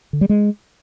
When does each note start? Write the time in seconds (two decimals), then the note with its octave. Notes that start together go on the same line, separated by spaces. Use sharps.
0.13 D3
0.21 G3
0.29 G#3